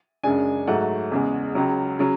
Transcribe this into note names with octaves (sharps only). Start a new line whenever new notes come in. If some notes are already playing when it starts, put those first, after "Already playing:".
F#2 C#3 G#3 D4 G#5
G#2 F#3 A3 F#5
E2 C#3 G#3
C#2 C#3 F#3
C#3 F#3